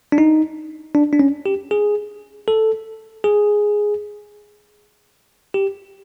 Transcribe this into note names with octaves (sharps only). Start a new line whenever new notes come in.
D4
D#4
D4
D4
C#4
G4
G#4
A4
G#4
G4